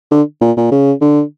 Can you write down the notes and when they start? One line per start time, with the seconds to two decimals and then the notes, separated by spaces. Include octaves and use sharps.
0.11 D3
0.41 A#2
0.57 A#2
0.71 C#3
1.01 D3